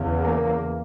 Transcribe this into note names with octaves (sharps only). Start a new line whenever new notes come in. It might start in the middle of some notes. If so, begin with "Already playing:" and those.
Already playing: E2 C#3
A#3